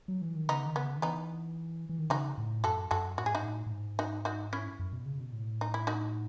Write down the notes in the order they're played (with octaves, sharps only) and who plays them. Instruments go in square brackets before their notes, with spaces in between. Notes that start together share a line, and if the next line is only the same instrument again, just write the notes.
[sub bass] F#3
E3
D#3
[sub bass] C#3 [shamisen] B3 D#4
[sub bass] D#3
[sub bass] C#3 [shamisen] B3
[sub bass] D#3
[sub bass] E3 [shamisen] B3 D#4
[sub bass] E3
D#3
[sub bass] C#3 [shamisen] D#4 F#4
[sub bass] A2
[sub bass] F#2 [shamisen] F#4 A4
[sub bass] F#2 [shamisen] F#4 A4
[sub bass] A2 [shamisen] F#4
[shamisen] G#4
[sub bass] G#2 [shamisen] D#4 F#4
[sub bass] A2
A2
G#2
[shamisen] D#4 F#4
D#4 F#4
C#4 E4
[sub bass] F#2
B2
C#3
B2
A2
[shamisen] D#4
E4
D#4 F#4